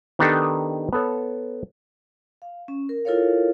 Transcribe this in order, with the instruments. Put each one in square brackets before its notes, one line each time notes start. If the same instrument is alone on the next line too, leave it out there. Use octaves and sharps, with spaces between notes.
[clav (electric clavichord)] D#3 B3 D4 D#4 G4 A4
B3 A4 C#5
[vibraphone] F5
C#4
A#4
E4 F4 A4 A#4 C#5 F5